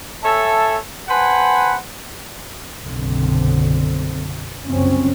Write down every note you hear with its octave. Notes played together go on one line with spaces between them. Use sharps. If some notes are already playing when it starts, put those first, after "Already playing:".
A4 C#5 E5 G#5 A5
B4 C5 F#5 G#5 A5 B5
F#1 B1 D3 C4
F#1 C2 F3 C4 C#4